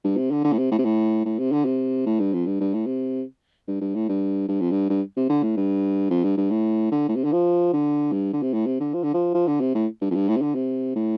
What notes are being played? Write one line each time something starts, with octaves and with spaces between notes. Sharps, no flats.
G2
C3
D3
D3
A2
C3
A2
C3
A2
A2
C3
D3
C3
A2
G2
F2
G2
G2
A2
C3
G2
G2
A2
G2
G2
F2
G2
G2
C3
D3
A2
G2
F2
G2
G2
A2
D3
A2
C3
D3
F3
D3
G2
D3
C3
A2
C3
D3
F3
D3
F3
F3
D3
C3
A2
G2
F2
G2
A2
C3
D3
C3
A2